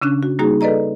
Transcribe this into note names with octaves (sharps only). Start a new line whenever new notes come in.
C#3 C#4 D4 F#6
F#4
G3 A#3 D#4 F#4 G#4 A#5
A4 B4 D5 D#5 A#5